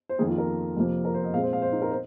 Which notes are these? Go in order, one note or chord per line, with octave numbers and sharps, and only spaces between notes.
C5
F2 D#3 A#3 G#4
F4
A#4
F2 C3 F3 A#3
A#4
C5
D#5
A#2 G#3 C4 F5
C5
F5
C5
D#4
A#4
C5